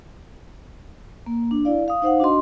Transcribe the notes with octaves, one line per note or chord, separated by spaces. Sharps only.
A#3
D4
E4 D5 F5
F5 D#6
D#4 C5 F5 F#5
D4 F#4 D#5 C6